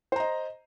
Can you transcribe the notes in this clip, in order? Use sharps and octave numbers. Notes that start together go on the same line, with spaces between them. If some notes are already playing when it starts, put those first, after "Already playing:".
C5 D#5 A#5